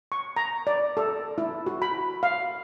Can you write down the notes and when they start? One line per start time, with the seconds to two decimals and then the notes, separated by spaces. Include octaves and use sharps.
0.12 C#6
0.36 A#5
0.67 D5
0.97 A4
1.38 E4
1.66 F#4
1.82 B5
2.23 F5